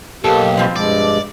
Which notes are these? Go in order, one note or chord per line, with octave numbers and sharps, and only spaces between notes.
B1 A#3 G4 A4
B2 F3 C4
G2 G#3 D5